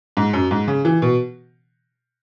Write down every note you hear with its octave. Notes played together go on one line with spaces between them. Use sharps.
G#2
F#2
G#2
C#3
E3
B2